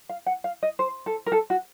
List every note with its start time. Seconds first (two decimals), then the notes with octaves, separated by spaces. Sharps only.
0.09 F5
0.26 F#5
0.44 F5
0.63 D#5
0.79 C5
1.06 A4
1.26 A#4
1.32 A4
1.50 F#4